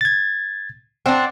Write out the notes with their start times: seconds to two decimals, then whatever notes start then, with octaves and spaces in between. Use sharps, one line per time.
0.01 G#6 A6
1.06 C4 D4 F#5